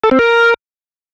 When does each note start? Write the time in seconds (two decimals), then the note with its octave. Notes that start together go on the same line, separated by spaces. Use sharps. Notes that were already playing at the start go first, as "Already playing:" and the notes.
0.04 A4
0.11 C4
0.19 A#4